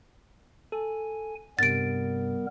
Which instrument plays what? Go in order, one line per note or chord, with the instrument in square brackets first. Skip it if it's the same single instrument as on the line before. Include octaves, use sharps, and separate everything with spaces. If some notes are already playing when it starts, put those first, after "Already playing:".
[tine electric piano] A4 [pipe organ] G#5
[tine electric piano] G2 C3 [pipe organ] G3 B3 A#4 [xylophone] A6 D7